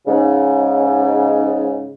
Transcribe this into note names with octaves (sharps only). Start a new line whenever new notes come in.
G#2 C#3